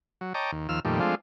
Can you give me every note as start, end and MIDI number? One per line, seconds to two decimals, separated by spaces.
0.21 0.33 54
0.34 0.51 73
0.34 0.51 75
0.34 0.51 79
0.34 0.51 81
0.34 0.51 82
0.34 0.51 86
0.52 0.69 39
0.69 0.80 39
0.69 0.80 53
0.69 0.80 88
0.69 0.80 89
0.85 1.00 41
0.85 1.00 46
0.85 1.00 51
0.85 1.00 55
0.85 1.00 57
1.00 1.15 53
1.00 1.15 56
1.00 1.15 57
1.00 1.15 60
1.00 1.15 62
1.00 1.15 65